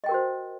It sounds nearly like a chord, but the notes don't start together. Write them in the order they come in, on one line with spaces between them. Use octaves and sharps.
D#5 G5 A#4 F#4 C5